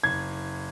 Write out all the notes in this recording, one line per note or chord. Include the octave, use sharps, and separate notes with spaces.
F#1 G#6